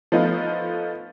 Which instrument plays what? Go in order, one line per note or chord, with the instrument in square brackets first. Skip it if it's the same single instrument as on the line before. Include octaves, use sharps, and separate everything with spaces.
[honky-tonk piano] F3 A3 B3 D#4 F4